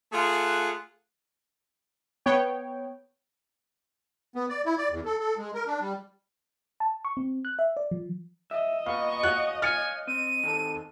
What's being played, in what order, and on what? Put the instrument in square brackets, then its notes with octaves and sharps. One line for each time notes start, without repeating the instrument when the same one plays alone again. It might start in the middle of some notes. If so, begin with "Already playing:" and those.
[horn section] A3 F4 G#4 F#5
[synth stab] B3 C#5 G5
[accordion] B3
D5
E4
D5
E2
A4
A4
G#3
A#4
D4
G3
[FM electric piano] A5
C#6
C4
F#6
E5
D5
F3
[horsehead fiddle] D#5 [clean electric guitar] E5
[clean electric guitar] A#2 B3 [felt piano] F5 [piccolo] C#6
[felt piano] F#4 F#6 [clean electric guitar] C#5 F5
[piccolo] G#5 [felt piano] F6 A6 C#7
[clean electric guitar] C4 [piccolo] D#7
[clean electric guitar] D#3 C4 A4